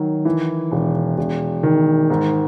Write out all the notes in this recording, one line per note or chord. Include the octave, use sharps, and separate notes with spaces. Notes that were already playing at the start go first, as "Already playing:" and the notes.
Already playing: D#3 F#3
E3
E1
E1
D#3
G#2